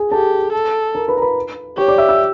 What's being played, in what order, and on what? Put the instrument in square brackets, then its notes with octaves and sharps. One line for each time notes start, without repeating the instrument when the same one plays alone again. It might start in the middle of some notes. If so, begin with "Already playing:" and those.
Already playing: [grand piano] G#4 G#5
[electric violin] G4 [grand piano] A4 A5
[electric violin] A4
[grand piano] A#4 A#5
B4 B5
A#5
B4 B5
[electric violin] G4 [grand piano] C#5 C#6
[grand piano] D5 D6
E5 E6
E5 E6